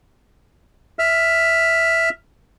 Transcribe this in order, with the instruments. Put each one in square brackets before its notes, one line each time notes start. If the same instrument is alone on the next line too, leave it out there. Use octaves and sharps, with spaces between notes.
[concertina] E5 F6